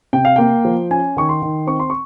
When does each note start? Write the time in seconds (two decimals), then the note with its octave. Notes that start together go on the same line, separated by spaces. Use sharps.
0.13 C3 G5
0.25 F5
0.36 A#3 G5
0.65 F3
0.91 C#4 G#5
1.17 D#3 C#6
1.29 C6
1.42 D#3
1.67 C4 C#6
1.80 C6
1.90 C#6